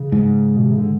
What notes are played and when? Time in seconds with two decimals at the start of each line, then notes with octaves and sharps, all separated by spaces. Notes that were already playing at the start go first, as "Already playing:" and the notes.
Already playing: C#3
0.12 G#2
0.56 B2
0.63 C3
0.71 C#3
0.78 D3